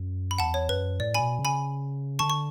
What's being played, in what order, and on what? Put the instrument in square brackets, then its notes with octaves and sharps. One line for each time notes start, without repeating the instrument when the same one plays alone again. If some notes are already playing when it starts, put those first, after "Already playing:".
Already playing: [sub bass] F#2
[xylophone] B5
[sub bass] E2 [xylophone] F#5 A5
[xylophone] C#5
[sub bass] F#2 [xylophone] B4
[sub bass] A2 [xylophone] D5
[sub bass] B2 [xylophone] G#5 B5
[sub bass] C#3
[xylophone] G#5 B5
[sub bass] D3 [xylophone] A5 C#6
[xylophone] C#6